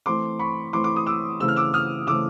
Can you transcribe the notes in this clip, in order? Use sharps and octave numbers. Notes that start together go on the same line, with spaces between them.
E3 A3 C4 C6 D6
B5 C#6
E3 A3 C4 C6 D6
D6
D#6
D6 E6
C#3 E3 A3 C4 E6
F6
D6 E6
D#6 F6
C#3 E3 A3 C4 D6 E6